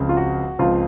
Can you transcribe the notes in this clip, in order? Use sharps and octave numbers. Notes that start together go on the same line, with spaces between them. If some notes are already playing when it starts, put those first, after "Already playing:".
Already playing: C#2 C#3 F3 C4
F4
F#4
C#2 C#3 F3 C4 F4